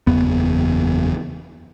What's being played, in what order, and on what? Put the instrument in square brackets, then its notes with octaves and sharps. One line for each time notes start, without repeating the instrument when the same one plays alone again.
[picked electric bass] F#1 E2 B3